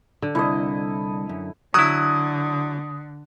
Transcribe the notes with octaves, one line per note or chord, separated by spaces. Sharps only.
D3
C2 E4 A4 D#5
F#2
D3 F#3 E4 D#6 F#6